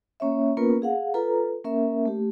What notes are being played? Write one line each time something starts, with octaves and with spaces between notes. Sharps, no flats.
A#3 C#4 C#5 E5
A#3 B3 C#4 F4 A#4 B4
G#4 F5 F#5
F4 A4 B4 A#5
A#3 C#4 A#4 E5
A3 G4